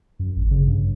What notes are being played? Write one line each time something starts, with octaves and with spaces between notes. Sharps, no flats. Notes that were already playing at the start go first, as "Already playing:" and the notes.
F#2
G#1
C#3
G2